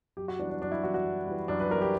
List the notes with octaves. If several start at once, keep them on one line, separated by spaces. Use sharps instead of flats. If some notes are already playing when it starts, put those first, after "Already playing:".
F#2 G4
F#4
E3 G3 D4
D4
F#2 D4
E4
E3 G3 F#4
F#4
F#2
E3 G3
F#2 D4
B4
E3 G3 A#4
G4